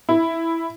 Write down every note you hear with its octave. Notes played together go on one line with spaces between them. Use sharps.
E4